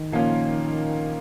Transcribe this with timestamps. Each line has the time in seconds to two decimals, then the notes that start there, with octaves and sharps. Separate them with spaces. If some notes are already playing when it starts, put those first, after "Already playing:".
Already playing: D#3
0.12 A#2 F3 A#3 C#4 F4